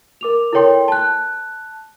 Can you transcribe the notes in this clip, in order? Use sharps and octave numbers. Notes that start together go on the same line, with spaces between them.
A#4 D6 F7
E4 A4 A#4 C#5 G5 C6
A5 F#6